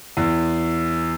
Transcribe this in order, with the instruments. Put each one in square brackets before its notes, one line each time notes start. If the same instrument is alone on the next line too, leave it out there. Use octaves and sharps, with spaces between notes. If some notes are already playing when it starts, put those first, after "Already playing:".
[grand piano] E2